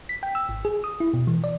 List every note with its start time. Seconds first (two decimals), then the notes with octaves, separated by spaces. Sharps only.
0.09 B6
0.23 G5
0.35 E6
0.49 G#1
0.65 G#4
0.84 D#6
1.00 E4
1.14 B2
1.27 E3
1.44 D5